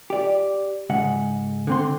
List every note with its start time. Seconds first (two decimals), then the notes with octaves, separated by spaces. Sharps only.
0.10 G4 D5
0.90 G#2 C#3 F#5
1.67 D3 C4 C6